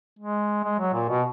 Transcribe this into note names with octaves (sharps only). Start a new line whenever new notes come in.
G#3
G#3
F#3
A#2
B2